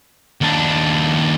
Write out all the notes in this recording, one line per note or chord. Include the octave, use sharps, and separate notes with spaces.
D#2 D4